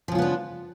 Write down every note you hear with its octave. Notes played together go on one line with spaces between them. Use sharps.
C#3 F3 B3 D4 F4